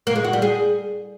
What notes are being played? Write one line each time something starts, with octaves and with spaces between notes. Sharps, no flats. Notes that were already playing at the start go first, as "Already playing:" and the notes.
A#3
G#3
F#4
G3
G#4